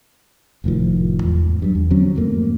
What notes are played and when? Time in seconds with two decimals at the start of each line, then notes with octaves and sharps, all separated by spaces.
0.64 F1 A2 D#3 F3
1.23 E2 G#2
1.62 G2 F#3
1.75 E2
1.90 D3 F#3 C4 C#4
2.15 F2 G#2 A3 A#3